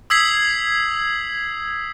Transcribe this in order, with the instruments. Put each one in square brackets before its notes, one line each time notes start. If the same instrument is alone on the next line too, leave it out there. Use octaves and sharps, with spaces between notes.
[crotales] D#6 E6 G#6 B6 C7 F#7